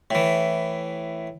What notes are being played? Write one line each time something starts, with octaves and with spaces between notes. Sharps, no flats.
A2 E3